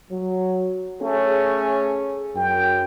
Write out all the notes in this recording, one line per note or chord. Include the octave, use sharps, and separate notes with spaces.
F#3
A3 C#4 G#4
F#2 G5